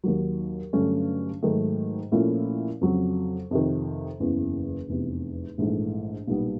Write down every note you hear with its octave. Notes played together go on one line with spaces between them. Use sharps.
D#2 D#3 F#3
G2 D3 F#3 A3 C#4
G#2 D#3 F#3 A3
A#2 F3 A3 C#4 E4
F2 C#3 F#3
F2 C3 D#3
F#1 E2 C#3 E3
F1 E2 C3
A#1 G#2 E3 A3
B1 A#2 G3 B3